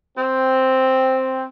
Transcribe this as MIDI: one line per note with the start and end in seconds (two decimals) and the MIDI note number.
0.17 1.43 60